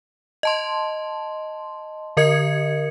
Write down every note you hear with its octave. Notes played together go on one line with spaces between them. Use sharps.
D#5 A5 C6
D3 A#4 D#5 G#6 C#7